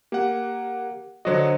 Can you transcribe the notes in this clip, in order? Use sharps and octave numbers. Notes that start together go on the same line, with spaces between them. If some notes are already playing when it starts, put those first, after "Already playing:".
A#3 G4 F#5
D3 F#3 F#4 C5 D#5